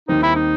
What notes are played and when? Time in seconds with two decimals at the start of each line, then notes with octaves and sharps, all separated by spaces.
0.08 D#2 D#3 G3 C4 D#4
0.22 E4
0.36 D#4